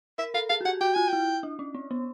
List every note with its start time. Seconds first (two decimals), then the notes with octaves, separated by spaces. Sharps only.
0.18 A#4 E5
0.34 A4 F5
0.50 G#4 F5
0.61 F#4
0.65 G4 F#5
0.81 F#4 G5
0.95 F4 G#5
1.08 E4 G5
1.43 D4
1.59 C#4
1.74 C4
1.91 B3